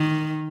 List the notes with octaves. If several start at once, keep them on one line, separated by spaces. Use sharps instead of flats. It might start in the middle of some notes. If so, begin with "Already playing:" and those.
Already playing: D#3